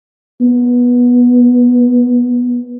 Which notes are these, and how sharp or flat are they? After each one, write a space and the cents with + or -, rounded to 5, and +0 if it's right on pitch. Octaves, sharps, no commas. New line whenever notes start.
B3 -15